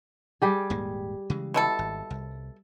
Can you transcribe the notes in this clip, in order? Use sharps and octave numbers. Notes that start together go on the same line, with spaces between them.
G3 G4 G#4
D#1 G#2 A#3
C#3 E3 G#3
B2 E4 A4
G#1
C2